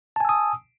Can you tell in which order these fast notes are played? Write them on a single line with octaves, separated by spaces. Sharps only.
A5 G#5 E6 D#6